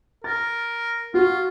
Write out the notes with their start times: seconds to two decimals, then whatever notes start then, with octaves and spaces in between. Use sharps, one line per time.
0.24 A#4 A6
1.14 F4 F#4